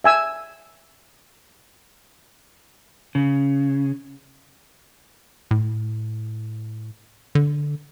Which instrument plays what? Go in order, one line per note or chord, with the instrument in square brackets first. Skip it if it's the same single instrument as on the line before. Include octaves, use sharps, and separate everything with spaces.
[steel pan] E5 G#5 E6
[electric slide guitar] C#3
[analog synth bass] A2
D3